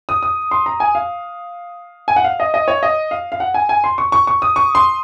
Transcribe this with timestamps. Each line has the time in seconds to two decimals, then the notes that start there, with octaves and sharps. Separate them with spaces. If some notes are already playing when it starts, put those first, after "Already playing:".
0.09 D#6
0.23 D#6
0.51 C6
0.66 A#5
0.80 G#5
0.95 F5
2.08 G#5
2.16 F#5
2.24 F5
2.40 D#5
2.54 D#5
2.68 C#5
2.83 D#5
3.11 F5
3.32 F5
3.40 F#5
3.54 G#5
3.69 G#5
3.84 C6
3.98 C#6
4.12 C#6
4.27 C#6
4.42 D#6
4.56 C#6
4.75 C6